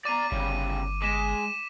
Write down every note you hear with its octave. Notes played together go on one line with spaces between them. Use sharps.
D5 A#5 D6 D#7
G1 C#3 G3
G#3 D6 B6 E7